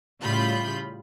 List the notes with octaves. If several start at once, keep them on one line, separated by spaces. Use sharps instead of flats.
A2 C#3 G3 F4 B5 G6